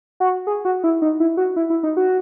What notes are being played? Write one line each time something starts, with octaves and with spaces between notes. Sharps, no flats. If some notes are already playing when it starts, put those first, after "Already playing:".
F#4
G#4
F#4
E4
D#4
E4
F#4
E4
E4
D#4
F#4